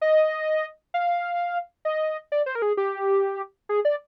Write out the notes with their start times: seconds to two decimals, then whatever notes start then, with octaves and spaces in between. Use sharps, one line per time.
0.01 D#5
0.94 F5
1.85 D#5
2.32 D5
2.46 C5
2.55 A#4
2.62 G#4
2.77 G4
3.69 G#4
3.85 D5